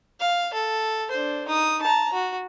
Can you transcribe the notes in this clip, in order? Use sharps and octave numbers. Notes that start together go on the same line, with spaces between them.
F5
A4
D4 C5
D#4 D#6
A5 A#5
F#4